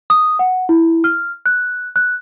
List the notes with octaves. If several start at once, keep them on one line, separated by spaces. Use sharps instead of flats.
D#6
F#5
E4
F6
F#6
F#6